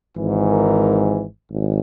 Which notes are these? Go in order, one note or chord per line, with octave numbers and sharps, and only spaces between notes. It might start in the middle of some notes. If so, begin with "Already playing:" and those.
G#1 G#2 E3
A#4
G#1